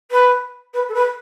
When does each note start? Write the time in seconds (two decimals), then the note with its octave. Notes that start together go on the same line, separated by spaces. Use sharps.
0.11 B4
0.73 B4
0.88 A4
0.94 B4